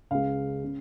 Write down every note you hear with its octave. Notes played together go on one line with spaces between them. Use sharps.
C#2 C#3 G#3 F5
C#3